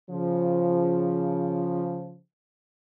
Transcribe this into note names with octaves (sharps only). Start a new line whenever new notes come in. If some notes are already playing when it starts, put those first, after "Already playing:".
C#3 F3